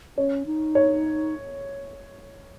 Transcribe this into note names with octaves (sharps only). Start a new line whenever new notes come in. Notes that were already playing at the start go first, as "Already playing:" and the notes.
C#4 C#5
D#4
C#5